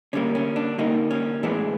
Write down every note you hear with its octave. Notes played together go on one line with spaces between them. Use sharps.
D3 G3 A#3 C#4
C#4
D4
D3 G3 A#3 D#4
C#4
A2 E3 G#3 B3 D4